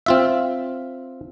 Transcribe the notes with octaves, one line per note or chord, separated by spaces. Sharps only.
C4 F4 E5